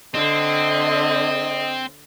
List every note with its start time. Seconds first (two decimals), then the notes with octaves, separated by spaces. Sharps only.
0.15 D3 C4 D#5 E5